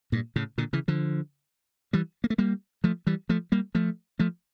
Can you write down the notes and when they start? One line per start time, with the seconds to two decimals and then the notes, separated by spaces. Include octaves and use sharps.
0.12 G2 A#2
0.36 A2 C#3
0.58 A#2 D3
0.73 C#3 E3
0.88 D3 F3
1.93 E3 G3
2.24 A#3
2.30 A3
2.38 G3 A#3
2.84 F3 A3
3.07 E3 G3
3.29 F3 A3
3.52 G3 A#3
3.75 F3 A3
4.19 F3 A3